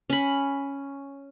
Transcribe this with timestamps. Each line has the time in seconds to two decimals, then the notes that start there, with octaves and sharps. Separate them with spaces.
0.10 C#4 B5